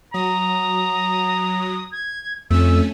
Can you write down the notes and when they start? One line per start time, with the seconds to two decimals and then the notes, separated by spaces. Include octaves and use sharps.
0.14 F#3 A#5 D#6
1.92 G#6
2.50 F2 A3 C#4 E6